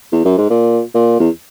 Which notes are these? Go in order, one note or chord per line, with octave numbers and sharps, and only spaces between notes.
E2
F#2
G#2
A#2
A#2
E2